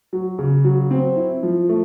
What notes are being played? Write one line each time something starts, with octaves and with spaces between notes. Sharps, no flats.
F#3
C#3
F#3
C4
E4
F3
A3